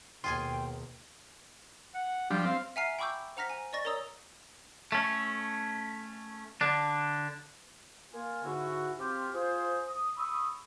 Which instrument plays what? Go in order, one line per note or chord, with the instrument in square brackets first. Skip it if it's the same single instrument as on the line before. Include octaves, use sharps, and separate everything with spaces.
[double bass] D#2 B2 [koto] F4 G#4 G#5 [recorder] G5 [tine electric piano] C6
[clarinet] F#5
[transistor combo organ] F3 G3 D4 [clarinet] F4
[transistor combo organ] C4 [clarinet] F5
[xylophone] E5 F#5 G#5 A#5 F6 C7
G5 B5 C#6 D6 E6 G6
C5 F#5 A#5 F6 A#6 B6
G#5
D5 D#5 C#6 A6 A#6
A#4 C#5 A#5 D#6 E6
[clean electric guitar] A3 C#4
D3 D4
[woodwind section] A#3 F4 G#5
G#2 D3 C#4 E4 F#4
C4 F4 G4
F4 G#4 C5
D#6
B5 C#6 D#6 E6